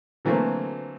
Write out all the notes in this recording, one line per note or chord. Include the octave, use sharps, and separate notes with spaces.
D3 E3 F#3 A3 A#3 C4